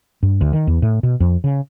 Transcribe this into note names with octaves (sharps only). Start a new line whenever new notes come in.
G2
D2
D#3
E2
A2
B2
F2
C#3